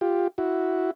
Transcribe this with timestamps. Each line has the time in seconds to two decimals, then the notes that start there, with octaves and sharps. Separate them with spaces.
0.01 F4 G4
0.38 E4 F#4